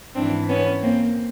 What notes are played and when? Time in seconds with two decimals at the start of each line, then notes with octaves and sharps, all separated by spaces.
0.15 G#2 E3 C4 D4
0.48 B3 C#4
0.82 A#3 C4